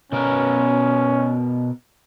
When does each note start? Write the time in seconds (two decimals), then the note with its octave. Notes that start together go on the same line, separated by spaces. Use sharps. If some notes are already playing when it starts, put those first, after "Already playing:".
0.12 B2 B3 C#4 A#4